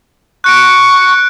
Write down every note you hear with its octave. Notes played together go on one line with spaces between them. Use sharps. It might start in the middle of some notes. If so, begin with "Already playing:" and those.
C#6 F#6 C#7 D7